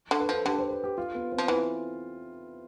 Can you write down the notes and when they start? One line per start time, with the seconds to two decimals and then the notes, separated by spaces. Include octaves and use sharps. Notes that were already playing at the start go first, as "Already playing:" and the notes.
0.11 D3
0.20 B4
0.29 F3 A4
0.46 D3 G4
0.53 B4
0.59 C5
0.71 B4
0.84 G4
0.98 F4
1.15 B3
1.32 C4
1.38 F3
1.48 E3 E4